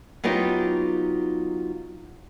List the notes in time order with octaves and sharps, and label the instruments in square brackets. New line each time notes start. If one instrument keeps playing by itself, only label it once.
[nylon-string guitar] F#3 B3 D#4 F4 G4